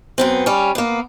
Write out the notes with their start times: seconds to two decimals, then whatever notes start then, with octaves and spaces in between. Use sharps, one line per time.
0.18 F#2 B3 C4
0.46 G3 C#4
0.75 A#3 B3